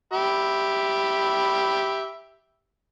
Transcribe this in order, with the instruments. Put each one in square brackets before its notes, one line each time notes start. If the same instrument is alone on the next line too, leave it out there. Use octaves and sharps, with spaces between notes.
[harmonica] G4 E5 B5